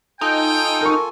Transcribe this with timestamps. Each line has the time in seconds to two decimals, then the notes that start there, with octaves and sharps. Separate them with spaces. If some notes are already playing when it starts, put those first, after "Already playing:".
0.21 D#4 F4 A4 G5 G#5
0.81 A#4 C#6